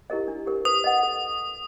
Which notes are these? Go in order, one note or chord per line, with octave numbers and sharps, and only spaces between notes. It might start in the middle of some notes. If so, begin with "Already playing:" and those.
E4 G4 A#4 D#5
D4
G4 A#4
B4 D#6
D#5 F#5
A4